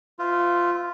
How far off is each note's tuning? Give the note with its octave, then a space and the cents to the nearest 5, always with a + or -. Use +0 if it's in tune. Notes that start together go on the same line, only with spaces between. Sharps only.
F4 +0 C5 -45 E5 -5